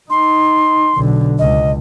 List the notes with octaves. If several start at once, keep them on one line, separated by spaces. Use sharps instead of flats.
D#4 C6
B1 D3
C#2 D#5